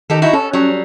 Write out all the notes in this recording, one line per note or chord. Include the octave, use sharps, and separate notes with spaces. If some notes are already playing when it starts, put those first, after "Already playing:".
D#3 D#4 G4 A4
D#4 E4 F#4
C#4 A4
F#3 G3